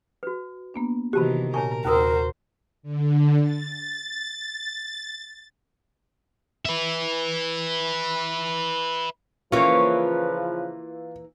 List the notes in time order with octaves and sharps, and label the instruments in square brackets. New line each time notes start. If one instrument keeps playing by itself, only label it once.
[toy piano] F#4 B4
[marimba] A#3 B3 D4
[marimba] C3 F#4 [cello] D#3 E3 [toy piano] G4 A5 B5
[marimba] A#2 G#5 [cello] A#4 [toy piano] C#5 A5 C#6
[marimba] D#2 D#6 E6 [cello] F#4 C5 [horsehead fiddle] A#4
[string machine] D3
A6
[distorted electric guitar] B4 E5
[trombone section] C#3 F3 B4 [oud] E3 A#3 [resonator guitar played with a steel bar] C#4 C#5 [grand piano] F4